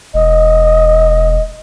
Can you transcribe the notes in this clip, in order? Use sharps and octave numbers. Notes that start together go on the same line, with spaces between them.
E1 D#5